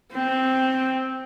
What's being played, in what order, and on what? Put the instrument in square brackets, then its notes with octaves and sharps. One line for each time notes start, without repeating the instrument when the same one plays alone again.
[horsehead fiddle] C4